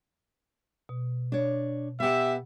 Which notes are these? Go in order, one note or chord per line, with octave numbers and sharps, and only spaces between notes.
B2
D4 C#5
B3 G4 E5 F#5